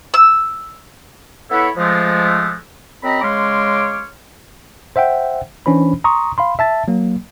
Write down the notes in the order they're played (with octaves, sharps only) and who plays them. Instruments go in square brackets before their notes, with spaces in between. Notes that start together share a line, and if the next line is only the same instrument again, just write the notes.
[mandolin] E6
[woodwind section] B3 E4 A4 C#5 E5 B5
F3 G#3 A3
F#2 C4 D#5 A#5 B5
C#3 G#3 C#5 C6 D6 F6
[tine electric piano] C5 E5 F#5 G5
E3 C#4 D4 C5 B5
A#5 C6 C#6 D#6
F5 B5 C6
E5 A5 A6
F#3 A#3